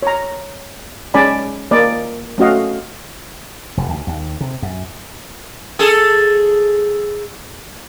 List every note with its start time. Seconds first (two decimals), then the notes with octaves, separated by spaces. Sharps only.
0.03 C#5 A#5
1.14 G#3 C#4 D5 G#5 A5 B5
1.71 A#3 D5 D#5
2.38 A3 C#4 F#4 D#5 F5
3.77 F1
3.89 D2
4.07 D#2
4.41 C3
4.62 F#2
5.79 G#4 A4